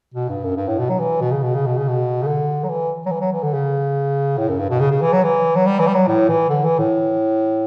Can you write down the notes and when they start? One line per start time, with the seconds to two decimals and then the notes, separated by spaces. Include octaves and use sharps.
0.14 B2
0.29 G2
0.44 F#2
0.57 G2
0.68 A2
0.78 B2
0.89 F#3
0.99 E3
1.21 B2
1.32 C#3
1.43 B2
1.55 C#3
1.66 B2
1.77 C#3
1.88 B2
2.22 C#3
2.27 D3
2.64 F#3
2.69 E3
3.06 F#3
3.11 E3
3.21 F#3
3.33 E3
3.43 D3
3.54 C#3
4.38 A2
4.49 F#2
4.59 G2
4.70 B2
4.80 C#3
4.91 C#3
5.02 E3
5.13 F#3
5.24 E3
5.55 F#3
5.66 G3
5.79 E3
5.87 G3
5.94 F#3
6.08 A2
6.29 E3
6.50 D3
6.64 E3
6.79 A2